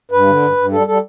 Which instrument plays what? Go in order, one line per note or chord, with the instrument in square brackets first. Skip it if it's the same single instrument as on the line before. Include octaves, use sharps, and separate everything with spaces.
[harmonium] G2 B4
D3
G2
G2
G3 A4
G3 A4